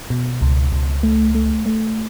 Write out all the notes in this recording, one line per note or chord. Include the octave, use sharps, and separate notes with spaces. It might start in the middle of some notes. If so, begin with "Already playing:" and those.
B2
C#2
C#2
A3
A3
A3